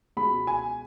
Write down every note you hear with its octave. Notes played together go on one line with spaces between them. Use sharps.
C#2 B2 B5
G#5